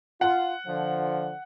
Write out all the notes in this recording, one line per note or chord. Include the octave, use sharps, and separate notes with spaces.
F4 F#5
D3 F3